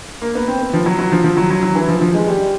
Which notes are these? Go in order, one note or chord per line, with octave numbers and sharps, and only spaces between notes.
A#3
B3
C4
B3
F3
F#3
F#3
F3
F3
F#3
F#3
F#3
E3
F3
F3
G#3
G3